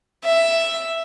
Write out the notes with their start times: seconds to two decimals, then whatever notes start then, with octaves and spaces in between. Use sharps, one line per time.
0.25 E5